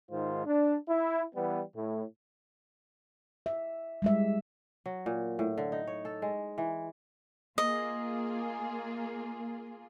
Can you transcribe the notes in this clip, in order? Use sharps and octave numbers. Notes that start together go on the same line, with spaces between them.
G#2 D#3 F4 C5
D4
E4
E3 G3 B3
A2
E5
G3 G#3 E5
F#3
A#2
A2
D3
D#4
C#5
A4
G#3
E3
A#3 F4 G#4 D#5